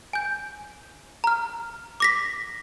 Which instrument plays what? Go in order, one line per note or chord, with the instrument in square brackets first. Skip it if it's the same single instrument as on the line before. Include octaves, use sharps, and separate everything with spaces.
[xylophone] G#5 G6
A#5 F6
D6 A#6 B6